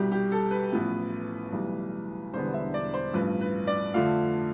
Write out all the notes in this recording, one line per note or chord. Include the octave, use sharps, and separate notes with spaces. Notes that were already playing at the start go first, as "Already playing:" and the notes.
Already playing: C2 B2 G3 G4
G4
A4
B4
A1 A2 F3 B3
B1 A2 E3 G3
E1 E2 D3 G3 B3 C5
E5
D5
C5
A1 G2 F3 B4
B4
D5
F2 D3 F3 A3 D4 F5